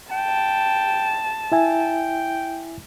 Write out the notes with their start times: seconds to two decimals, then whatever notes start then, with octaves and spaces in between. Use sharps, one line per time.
0.12 G5 A5
1.52 E4 E5 G5 G#5